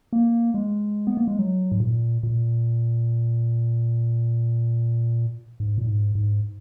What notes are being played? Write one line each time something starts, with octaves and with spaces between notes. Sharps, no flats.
A#3
G#3
B3
A#3
G#3
F#3
G#2
A#2
A#2
G#2
A#2
G#2
G#2